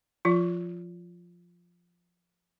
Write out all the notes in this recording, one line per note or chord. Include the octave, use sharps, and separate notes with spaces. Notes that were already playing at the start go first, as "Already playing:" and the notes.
F3 F4